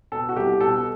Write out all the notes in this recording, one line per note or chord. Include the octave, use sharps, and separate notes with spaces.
B2 A4
F#4
C2 G4
B2 A4